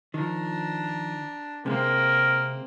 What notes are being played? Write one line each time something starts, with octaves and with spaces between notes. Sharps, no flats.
D#3 F3 D4 A#5
C3 G#3 A#3 C4 A#4